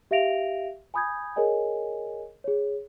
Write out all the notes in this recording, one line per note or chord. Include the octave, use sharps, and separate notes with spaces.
G4 E5 F5 A#6 D7 F7
G#5 B5 D#6 G6 G#6
G#4 A#4 C#5 D#5 G#5
G#4 C#5